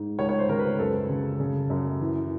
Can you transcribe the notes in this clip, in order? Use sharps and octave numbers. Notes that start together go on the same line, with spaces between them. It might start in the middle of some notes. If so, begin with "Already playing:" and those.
Already playing: G#2
C#2 C#5
C#5
C5
C#3 A#4
B4
F#2 A4
C#3
C#3
F#2
E3